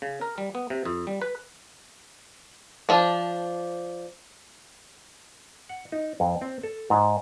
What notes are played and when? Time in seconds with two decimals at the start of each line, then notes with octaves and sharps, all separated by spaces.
0.02 C#3
0.21 A#4
0.38 G3
0.55 B3
0.70 C3
0.85 F2
1.07 G3
1.22 B4
2.89 F3 D4
5.69 F#5
5.92 D#4
6.20 F2
6.41 C4
6.63 A4
6.90 G#2